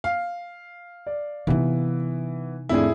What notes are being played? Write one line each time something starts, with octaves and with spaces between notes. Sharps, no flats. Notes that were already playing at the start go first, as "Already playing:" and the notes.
F5
D5
C3 E3 B3 D#4
F2 A2 D4 E4 G#4